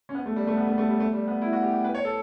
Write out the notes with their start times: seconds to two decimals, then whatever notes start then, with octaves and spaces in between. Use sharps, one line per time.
0.09 C#4
0.15 B3
0.26 A3
0.36 G3
0.47 A3
0.57 B3
0.67 A3
0.78 A3
0.89 G3
1.00 A3
1.13 G3
1.27 B3
1.42 E4
1.53 F#4
1.63 G4
1.73 G4
1.84 B4
1.95 C#5
2.05 A4